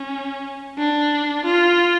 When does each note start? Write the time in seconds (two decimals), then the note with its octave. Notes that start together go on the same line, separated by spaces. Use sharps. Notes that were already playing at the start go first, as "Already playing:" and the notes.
Already playing: C#4
0.78 D4
1.45 F4